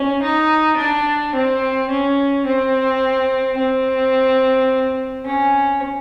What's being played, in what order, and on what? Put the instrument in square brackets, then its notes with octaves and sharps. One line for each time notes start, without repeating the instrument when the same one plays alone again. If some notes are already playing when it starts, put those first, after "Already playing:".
Already playing: [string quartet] C#4
D#4
D4
C4
C#4
C4
C4
C#4